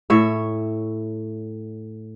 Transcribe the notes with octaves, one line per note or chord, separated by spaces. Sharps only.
A2 C#5 E5